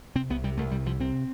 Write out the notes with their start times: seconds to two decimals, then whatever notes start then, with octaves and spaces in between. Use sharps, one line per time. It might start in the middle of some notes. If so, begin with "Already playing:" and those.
0.15 C3 C4
0.30 C2 B3
0.44 C3 G3
0.57 C2 A3
0.71 C3 G3
0.86 C2 F3
1.00 C3 C4